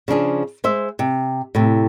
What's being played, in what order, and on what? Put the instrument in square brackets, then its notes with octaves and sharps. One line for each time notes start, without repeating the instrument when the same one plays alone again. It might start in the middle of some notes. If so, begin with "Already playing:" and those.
[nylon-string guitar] C#3 F3 D4 G#4
G#3 C5 E5
C3
A2 C3